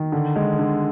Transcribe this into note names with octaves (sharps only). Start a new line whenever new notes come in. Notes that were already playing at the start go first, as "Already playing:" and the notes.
Already playing: D#3
D3
G#3
D3